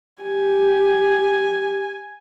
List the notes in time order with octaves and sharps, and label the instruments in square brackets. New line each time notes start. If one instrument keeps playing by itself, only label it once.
[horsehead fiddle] G4 [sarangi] G#5